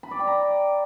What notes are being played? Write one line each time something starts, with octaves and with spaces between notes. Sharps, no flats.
B5
D5
G5
A#5